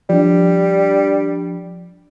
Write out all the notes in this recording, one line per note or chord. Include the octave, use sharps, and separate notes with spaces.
F3 G3 D4